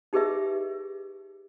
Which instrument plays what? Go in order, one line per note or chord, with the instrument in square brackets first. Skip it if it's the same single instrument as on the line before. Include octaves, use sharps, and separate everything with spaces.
[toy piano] D#4 G4 G#4 B4 D#5 E5